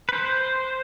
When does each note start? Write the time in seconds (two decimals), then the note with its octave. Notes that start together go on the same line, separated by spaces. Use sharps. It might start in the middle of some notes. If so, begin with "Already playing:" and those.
0.09 B4
0.13 C5